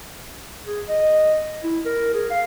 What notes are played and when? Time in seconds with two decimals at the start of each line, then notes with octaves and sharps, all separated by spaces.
0.67 G#4
0.89 D#5
1.64 E4
1.85 A#4
2.14 G#4
2.30 F5